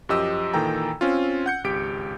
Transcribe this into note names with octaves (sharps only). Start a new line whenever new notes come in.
F#2 F3 G4 D#5 E6
A#2 D#3 E3 A4 G5 A#5
C4 C#4 F4
F#5 G6 C#7
G#1 C#2 G4 B6 D7